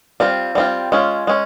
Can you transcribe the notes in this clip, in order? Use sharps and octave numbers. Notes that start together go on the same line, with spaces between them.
G3 C4 F4
G3 C4 F4
G#3 C#4 F4
G#3 C#4